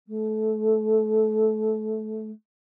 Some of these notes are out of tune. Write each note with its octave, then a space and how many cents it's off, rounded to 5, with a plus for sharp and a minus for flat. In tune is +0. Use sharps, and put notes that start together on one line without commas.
A3 -20